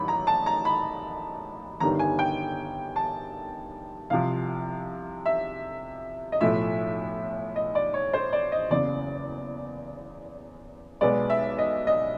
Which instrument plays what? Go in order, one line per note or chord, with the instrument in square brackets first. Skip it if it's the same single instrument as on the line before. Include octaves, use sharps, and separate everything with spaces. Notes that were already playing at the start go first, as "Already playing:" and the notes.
Already playing: [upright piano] A1 D#3 F#3 B5
A#5
A5
A#5
B5
G1 G2 D#3 G3 A#5
G#5
G5
A5
C2 C3 F3 F5
E5
D#5
B1 A2 F3 A3 E5
D#5
D5
C#5
C5
D5
D#5
F#1 E2 C#3 D5
B1 B2 G#3 B3 D5
E5
D#5
D#5